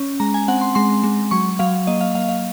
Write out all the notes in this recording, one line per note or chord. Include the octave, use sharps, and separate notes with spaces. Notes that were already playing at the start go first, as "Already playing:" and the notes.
Already playing: C#4
G#3 A#5
G#5
C4 F#5
C6
G#3 C6
G#3
F#3 C#6
F#3 F5
A#3 D#5
F5
A#3 F5
F5